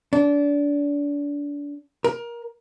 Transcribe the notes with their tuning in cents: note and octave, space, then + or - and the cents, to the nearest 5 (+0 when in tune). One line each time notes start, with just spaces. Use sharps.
D4 -30
A#4 +20